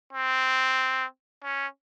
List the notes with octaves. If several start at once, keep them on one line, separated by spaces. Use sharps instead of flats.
C4
C#4